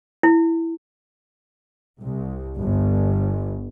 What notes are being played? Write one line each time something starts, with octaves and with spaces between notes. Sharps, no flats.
E4
C2
G1